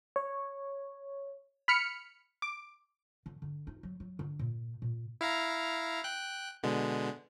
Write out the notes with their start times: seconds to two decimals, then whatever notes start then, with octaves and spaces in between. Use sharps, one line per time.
0.16 C#5
1.68 B5 F6 C#7
2.42 D6
3.26 D3
3.42 D3
3.67 D#4
3.83 F#3
4.00 F#3
4.19 D3
4.39 A#2
4.82 A#2
5.21 E4 F5 A#5
6.04 G5 F#6
6.63 B2 D3 G#3